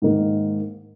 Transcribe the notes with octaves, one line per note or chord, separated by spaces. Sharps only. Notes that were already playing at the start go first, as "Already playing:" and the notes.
G#2 D#3 A#3 D#4